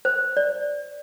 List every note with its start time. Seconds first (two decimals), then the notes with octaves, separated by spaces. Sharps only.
0.05 C5
0.37 D5